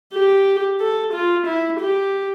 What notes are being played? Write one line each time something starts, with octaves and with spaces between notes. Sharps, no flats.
G4
A4
F4
E4
G4